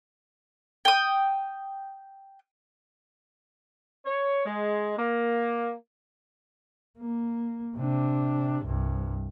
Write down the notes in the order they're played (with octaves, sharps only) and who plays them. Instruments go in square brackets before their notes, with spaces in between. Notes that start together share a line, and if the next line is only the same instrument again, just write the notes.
[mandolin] G5 D#6
[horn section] C#5
G#3
A#3
[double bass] A#3
C3 D4
C2 G2